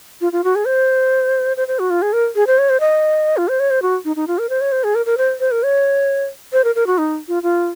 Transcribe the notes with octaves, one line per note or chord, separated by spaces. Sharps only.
F4
F4
F#4
G#4
C5
C5
C5
F#4
F4
G#4
A#4
G#4
C5
C#5
C5
D#5
F4
C5
C#5
C5
F#4
D#4
D#4
F4
A#4
C5
C#5
C5
G#4
A#4
A#4
C5
C5
A#4
C#5
C5
A#4
A#4
F#4
D#4
F4
F4